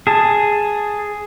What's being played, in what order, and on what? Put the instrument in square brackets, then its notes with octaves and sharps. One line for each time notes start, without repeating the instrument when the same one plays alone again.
[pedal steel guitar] G#4 A5